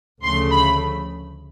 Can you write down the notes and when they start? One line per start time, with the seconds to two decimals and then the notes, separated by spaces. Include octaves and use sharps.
0.23 D2 C#3 F3 A3 C6
0.51 B5